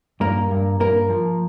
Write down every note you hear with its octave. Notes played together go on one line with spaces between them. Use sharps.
G2 A#3 A#4
G2
G2 A#3 A#4
F3